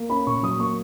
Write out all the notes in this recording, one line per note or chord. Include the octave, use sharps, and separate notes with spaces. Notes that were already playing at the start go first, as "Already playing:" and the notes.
Already playing: A#3
C#4 B5
A#2 C#6
F#3 D#6
A#3 C#6